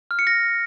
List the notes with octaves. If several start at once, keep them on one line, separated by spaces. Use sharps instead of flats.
F6
C#7
A#6